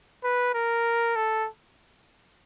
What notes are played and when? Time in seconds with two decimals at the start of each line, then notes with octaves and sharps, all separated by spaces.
0.24 B4
0.54 A#4
1.16 A4